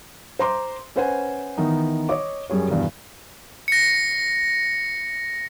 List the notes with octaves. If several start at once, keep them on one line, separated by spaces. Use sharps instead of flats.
C5 A#5 C6 D6
C#4 B4 C5 F#5 G#5
D#3 E3 B3 D#4
C#5 D#5 D6
F#2 G3 G#4 C#5
E2 G2 B2 D#3
A#6 C#7